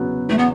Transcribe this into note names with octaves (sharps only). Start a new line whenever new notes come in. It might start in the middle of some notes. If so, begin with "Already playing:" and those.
Already playing: E2 C#3 F#3 B3
E2 A3
B3